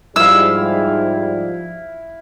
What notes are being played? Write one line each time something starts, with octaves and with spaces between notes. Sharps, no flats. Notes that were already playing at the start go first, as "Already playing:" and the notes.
G#2 F3 G3 E4 F5 E6